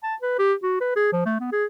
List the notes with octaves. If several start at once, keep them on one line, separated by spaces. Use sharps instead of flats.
A5
B4
G4
F#4
B4
G#4
F3
A3
B3
G#4